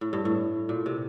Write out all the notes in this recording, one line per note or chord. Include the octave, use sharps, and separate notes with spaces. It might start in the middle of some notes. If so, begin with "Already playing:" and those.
A2
G2
A2
A#2
C3